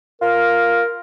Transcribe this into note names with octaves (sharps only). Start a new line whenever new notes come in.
F4 A#4